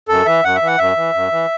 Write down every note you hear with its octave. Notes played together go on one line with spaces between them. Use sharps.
F#2 A4
E3 E5
F#2 F#5
E5
E3 F#5
F#2 E5
E3
F#2
E3